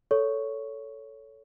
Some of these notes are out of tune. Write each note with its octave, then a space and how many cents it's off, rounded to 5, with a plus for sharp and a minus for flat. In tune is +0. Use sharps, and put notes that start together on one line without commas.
A4 +0 C#5 +15 C#6 +0